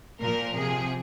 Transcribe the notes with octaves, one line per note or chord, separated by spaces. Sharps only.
A#2 F3 A#4
C3 F3 G#4